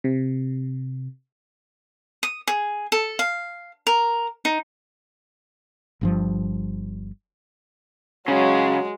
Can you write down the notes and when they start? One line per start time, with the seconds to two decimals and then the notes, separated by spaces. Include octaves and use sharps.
0.04 C3
2.23 D#6
2.48 G#4
2.92 A4
3.19 F5
3.87 A#4
4.45 D#4
6.01 G1 G2 F3
8.28 C#3 F#3 G#3